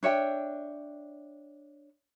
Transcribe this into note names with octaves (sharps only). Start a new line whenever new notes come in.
D4 C#5 E5 G5